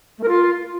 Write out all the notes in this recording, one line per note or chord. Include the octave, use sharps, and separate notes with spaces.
A3
A#4
F4